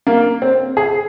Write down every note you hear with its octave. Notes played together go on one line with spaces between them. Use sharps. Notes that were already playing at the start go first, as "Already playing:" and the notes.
A#3
C4
G#4